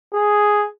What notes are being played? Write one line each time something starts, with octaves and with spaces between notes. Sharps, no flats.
G#4